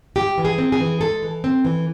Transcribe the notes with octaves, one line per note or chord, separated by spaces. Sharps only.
G#3 G4
E3
G#4
C4
G#4
E3
G#3 A4
E3
C4
E3